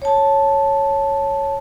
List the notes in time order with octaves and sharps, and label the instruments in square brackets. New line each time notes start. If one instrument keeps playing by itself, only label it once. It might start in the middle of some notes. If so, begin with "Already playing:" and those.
[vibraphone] C#5 A5